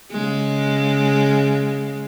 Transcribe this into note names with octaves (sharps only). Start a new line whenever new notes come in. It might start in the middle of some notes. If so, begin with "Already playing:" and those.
C#3 G#3